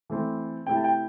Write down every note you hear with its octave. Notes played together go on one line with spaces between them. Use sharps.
E3 A3 C4
C3 A3 E4 G5
A5
G5